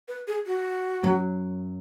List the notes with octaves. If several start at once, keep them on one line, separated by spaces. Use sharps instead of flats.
B4
G#4
F#4
F#2 F#3